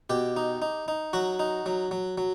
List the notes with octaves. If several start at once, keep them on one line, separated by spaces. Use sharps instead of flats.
B2 G4
D#4
D#4
D#4
F#3 F#4
D#4
F#3
F#3
F#3